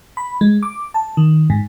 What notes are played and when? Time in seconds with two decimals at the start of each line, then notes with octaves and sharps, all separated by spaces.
0.17 B5
0.41 G#3
0.63 D6
0.94 A5
1.17 D#3
1.50 G#2